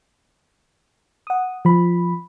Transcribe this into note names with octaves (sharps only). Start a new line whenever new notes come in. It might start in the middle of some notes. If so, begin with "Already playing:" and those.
F#5 D#6
F3 B5